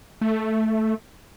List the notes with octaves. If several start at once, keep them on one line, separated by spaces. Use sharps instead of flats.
A3